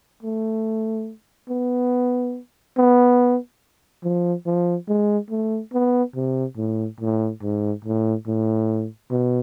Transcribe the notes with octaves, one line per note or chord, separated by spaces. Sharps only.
A3
B3
B3
F3
F3
G#3
A3
B3
C3
A2
A2
G#2
A2
A2
B2